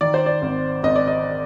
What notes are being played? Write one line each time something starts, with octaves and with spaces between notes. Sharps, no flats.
D#3 D5
C5
D5
G#1
G#1 D#5
D5
D#5